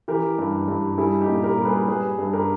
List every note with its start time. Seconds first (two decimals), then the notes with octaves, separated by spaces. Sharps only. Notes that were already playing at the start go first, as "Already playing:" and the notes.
0.08 E3 G4 A#4
0.38 G2
0.68 G2
0.98 G3 E4 G#4
1.20 D#4 G4
1.29 A#2
1.43 G4 A#4
1.58 G3
1.65 G#4 B4
1.88 G3 G#4 B4
2.19 G2
2.33 G4 A#4